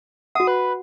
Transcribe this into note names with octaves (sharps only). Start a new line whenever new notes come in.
F#4 F#5 D#6
B4